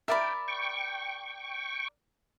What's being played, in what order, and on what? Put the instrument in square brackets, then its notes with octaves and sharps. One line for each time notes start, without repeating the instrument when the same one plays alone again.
[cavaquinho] A#4 D5 B5 [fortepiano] E5 [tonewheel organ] G5
[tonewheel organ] G5 C#6